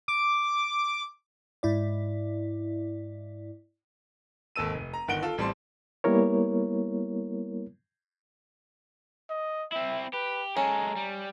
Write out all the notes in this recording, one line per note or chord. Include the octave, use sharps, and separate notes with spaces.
D6
G#2 E4 D5
G#1 D#2 A4 E6 D#7
F1
A#5
G1 D#3 F#5 D7 G7
F4 A4
A1 G3 C4 A5 C6
G3 A#3 B3 E4 A#4 C#5
D#5
C4 E4 E5
G4 B4
G#3 C#4 A4 A#5
G3